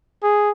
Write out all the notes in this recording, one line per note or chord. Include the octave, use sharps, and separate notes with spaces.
G#4